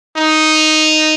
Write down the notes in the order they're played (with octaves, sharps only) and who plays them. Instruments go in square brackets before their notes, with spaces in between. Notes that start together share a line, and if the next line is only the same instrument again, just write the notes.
[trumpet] D#4